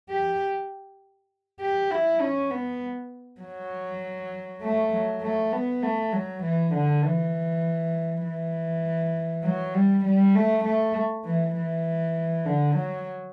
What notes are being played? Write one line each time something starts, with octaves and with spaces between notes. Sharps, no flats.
G4
G4
E4
C#4
B3
F#3
A3
F#3
A3
B3
A3
F#3
E3
D3
E3
E3
F#3
G3
G3
A3
A3
E3
E3
D3
F#3